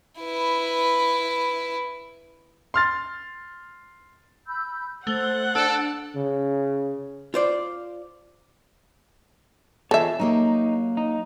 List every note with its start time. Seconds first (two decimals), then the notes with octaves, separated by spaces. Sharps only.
0.20 E4 B4
2.74 C6 F6 A6
4.47 B5 E6 G6
5.07 A3 C5 F#5 G7
5.56 D4 A4
6.15 C#3
7.34 F4 C5 D5
9.91 E2 F4 G#4 A4 C#5 D#5 E5
10.20 F#3 A#3 D#4 G4
10.97 D#4